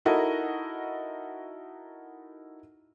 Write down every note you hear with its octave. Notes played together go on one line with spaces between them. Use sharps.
D#4 E4 F#4 A4 A#4 D#5